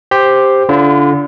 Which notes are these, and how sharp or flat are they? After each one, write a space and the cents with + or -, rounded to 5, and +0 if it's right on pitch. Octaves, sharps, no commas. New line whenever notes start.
G4 +5 C5 +0
D3 -30 F4 -35